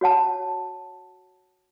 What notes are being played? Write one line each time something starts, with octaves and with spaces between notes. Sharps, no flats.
F#4 C#5 F#5 A5